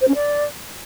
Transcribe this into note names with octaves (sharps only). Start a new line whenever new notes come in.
C5
C#4
D5